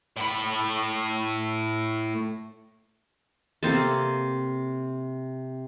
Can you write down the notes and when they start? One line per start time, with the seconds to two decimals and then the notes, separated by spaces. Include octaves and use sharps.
0.17 A2 B5
3.63 C3 A#3 C4 A4